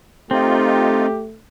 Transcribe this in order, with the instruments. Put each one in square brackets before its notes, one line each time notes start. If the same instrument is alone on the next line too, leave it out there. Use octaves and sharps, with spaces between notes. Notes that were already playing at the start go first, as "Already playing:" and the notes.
[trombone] A3 [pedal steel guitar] C4 [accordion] D#4 F4 [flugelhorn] G4